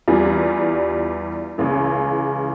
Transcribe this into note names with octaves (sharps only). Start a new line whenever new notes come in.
E2 E3 G3 D4 F4
C#2 C#3 E3